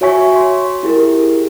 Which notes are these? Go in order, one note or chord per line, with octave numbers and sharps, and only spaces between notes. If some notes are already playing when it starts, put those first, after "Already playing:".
F#4 C#5 E5 G#5 C#6 B6
C6
E4 G4 G#4 A#4